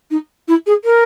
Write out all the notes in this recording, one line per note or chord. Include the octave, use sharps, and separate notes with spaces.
D#4
E4
G#4
A#4